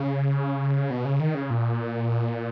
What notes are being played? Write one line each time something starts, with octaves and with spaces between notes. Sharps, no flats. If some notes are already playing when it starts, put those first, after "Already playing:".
Already playing: C#3
B2
C#3
D#3
C#3
A#2